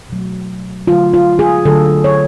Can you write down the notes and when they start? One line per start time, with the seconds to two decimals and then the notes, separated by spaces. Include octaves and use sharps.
0.09 B2 F#3 A3
0.87 D3 F#3 A3 F4
1.14 F4
1.39 G#4
1.65 D3 F#3 A3 A4
2.04 C#5